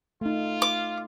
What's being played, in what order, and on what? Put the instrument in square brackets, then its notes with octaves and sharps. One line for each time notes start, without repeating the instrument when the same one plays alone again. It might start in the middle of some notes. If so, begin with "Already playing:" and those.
[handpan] A3 D#4 [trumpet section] F4
[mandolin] D6